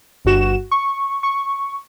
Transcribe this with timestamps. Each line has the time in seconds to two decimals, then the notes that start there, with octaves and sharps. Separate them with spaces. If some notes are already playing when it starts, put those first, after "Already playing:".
0.25 G1 G2 F#4 E7
0.71 C#6
1.23 C#6